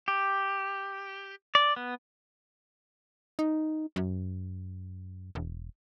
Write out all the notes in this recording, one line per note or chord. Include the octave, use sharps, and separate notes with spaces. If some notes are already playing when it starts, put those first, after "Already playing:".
G4
D5
B3
D#4
F#2
E1